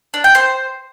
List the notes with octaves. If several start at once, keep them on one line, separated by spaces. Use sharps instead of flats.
D4
G5
C5